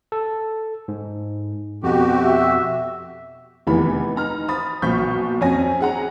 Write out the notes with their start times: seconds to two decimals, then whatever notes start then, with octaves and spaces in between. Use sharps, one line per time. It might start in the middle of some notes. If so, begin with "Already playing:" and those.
0.12 A4
0.88 G#2
1.83 F2 B2 C4 F#4 G4
2.22 E5
3.67 F1 E2 D#3 E3 B5
4.16 D#4 A#5 F6
4.48 C5 B5 D#6 A6
4.82 B1 A#2 F3 C#6 G6 B6
5.41 F2 C#4 G#5 A#6
5.80 G#4 F#5 A#5